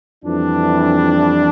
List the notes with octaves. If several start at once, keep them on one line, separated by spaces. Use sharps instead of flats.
F2 E3 G3 D4